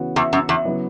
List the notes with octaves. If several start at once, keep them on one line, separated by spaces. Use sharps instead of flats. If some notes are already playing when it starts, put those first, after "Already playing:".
Already playing: C#3 E3 B3 F#4
E2
F#2
E2
C#3 F#3 B3 E4